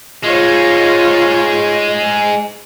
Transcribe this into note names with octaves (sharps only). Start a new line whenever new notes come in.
G#3 D#4 F4 C#5